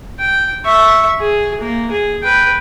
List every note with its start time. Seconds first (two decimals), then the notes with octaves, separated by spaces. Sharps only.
0.20 G5
0.65 E5 C#6
1.19 G#4
1.61 A#3
1.91 G#4
2.23 B4 G5